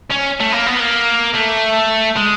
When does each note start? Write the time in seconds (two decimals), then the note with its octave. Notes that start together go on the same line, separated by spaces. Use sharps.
0.11 C#4
0.41 A3
0.52 A#3
0.66 B3
0.80 A#3
1.35 A3
2.17 G#3